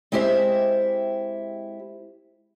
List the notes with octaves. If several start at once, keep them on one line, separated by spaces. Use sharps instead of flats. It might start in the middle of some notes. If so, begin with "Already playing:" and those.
G#3 C4 E4 G4 C5 E5